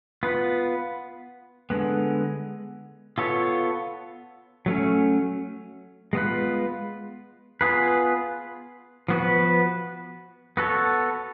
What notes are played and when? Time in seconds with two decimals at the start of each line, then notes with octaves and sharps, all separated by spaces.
0.23 B3 F4 B4
1.70 D3 G#3 B3
3.18 B3 F4 A4 C#5
4.66 F#3 A3 C#4
6.13 G#3 B3 F4 B4
7.61 B3 F4 G#4 B4
9.08 F3 B3 F#4 B4
10.57 B3 F#4 A4 C#5